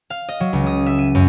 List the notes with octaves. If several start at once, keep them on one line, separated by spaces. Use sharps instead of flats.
F5
D#5
F#3
C#2
D#6
E5
D#7
F#2